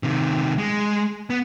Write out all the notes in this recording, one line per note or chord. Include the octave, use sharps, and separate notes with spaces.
C3 D#3
G#3
B3